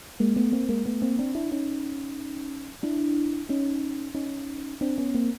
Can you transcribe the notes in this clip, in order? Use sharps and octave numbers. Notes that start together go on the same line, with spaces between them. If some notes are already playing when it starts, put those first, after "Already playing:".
G#3 A#3
A3 B3
A#3 C4
G#3 A#3
A3 B3
A#3 C4
C4 D4
D4 E4
C#4 D#4
D4 E4
C#4 D#4
C#4 D#4
C4 D4
B3 C#4
A#3 C4